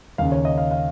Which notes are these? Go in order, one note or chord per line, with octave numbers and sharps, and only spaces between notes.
D#2 C#3 F5
C#5
D#5
F5
F5